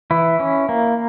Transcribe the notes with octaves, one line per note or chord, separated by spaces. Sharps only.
E3 E4
C#4
A#3